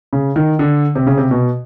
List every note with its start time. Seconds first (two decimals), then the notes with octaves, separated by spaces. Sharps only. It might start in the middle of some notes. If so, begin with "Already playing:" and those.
0.13 C#3
0.36 D#3
0.59 D3
0.95 C3
1.07 C#3
1.18 C3
1.31 B2